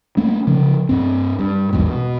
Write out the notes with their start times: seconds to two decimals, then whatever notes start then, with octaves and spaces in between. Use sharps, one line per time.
0.17 A3 A#3 C#4
0.47 C#3 F3
0.89 G2 C4
1.39 G2
1.73 A#1 E2 G#2 B2
1.86 B2